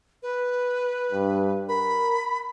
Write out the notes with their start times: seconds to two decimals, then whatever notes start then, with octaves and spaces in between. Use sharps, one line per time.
0.23 B4
1.12 G2
1.69 A#4 B5